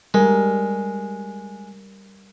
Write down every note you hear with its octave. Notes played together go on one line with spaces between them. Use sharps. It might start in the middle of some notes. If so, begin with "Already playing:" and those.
G3 G#3 A#4